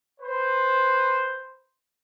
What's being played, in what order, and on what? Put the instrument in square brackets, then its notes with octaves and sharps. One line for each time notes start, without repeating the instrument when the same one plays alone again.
[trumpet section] B4 C5